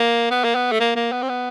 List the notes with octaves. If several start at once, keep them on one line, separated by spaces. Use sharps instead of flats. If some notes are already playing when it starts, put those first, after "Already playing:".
Already playing: A#3
B3
A#3
B3
A3
A#3
A#3
B3
C4
B3